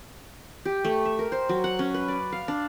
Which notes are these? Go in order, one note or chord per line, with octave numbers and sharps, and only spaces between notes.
G4
A3
E5
A#4
C5
F#3
F#5
C#4
B4
D5
F5
D4